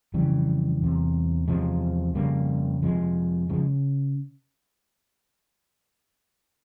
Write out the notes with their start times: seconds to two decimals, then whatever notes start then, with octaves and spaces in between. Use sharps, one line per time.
0.14 F2 C#3 E3 G3
0.81 E2 C3
1.48 E2 C3 F3 G#3
2.15 F2 C#3 G3 A#3
2.83 F2 C3 F3 G#3
3.49 C#3 F3 G#3